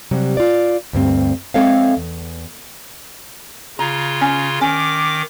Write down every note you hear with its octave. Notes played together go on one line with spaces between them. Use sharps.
C3 F#3 G3
F4 D5
D2 G2 C4
G#3 C4 A4 C#5 E5 F5
E2
C#3 F4 A#5
C#4
D#3 C#4 D6